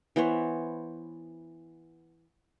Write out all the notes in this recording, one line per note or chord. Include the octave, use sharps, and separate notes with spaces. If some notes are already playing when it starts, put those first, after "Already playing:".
E3 B3 C5 C#5